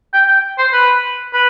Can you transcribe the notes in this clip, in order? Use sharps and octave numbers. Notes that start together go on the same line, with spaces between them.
G5
G5
C5
B4
B4